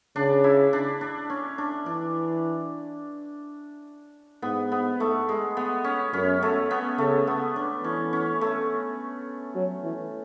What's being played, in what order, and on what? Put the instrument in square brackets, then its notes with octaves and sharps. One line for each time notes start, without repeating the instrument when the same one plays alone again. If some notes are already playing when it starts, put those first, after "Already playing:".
[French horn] C#3 [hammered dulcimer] D4
[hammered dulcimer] E4
D4
D4
C#4
D4
[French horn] E3 [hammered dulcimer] D4
[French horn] G#2 [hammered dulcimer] B3
[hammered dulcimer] B3
A3
G#3
B3
C#4
[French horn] F#2 [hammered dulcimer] C#4
[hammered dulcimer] A3
B3
[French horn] C#3 [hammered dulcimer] A3
[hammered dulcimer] B3
D4
[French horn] E3 [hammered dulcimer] C#4
[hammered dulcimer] C#4
A3
[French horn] F#3
E3